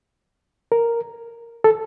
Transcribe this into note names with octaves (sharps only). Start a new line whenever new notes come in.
A#4
A4